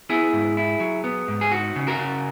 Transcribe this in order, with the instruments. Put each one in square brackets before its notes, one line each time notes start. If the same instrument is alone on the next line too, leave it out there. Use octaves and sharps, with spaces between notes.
[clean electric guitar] B3 E4 G#4
G#2
E4
F#3
B3
G#2
G#4
D#4 F#4
C#3
F#4 A#4
C#3